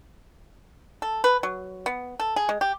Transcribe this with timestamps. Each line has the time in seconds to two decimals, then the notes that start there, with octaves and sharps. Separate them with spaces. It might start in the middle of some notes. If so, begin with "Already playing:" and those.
1.02 A4
1.24 B4
1.43 F#3
1.86 B3
2.20 A4
2.36 G#4
2.49 G#3
2.61 G4